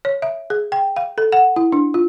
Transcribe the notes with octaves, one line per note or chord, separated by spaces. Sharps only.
C#5
E5
G#4
G5
F5
A4
F#5
E4
D4
F4